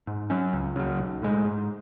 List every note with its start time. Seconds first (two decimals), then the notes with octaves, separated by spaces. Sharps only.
0.07 G#2
0.30 F#3 C#4
0.53 C#2
0.76 C#3 F#3
0.99 B1
1.22 A2 G#3
1.45 G#2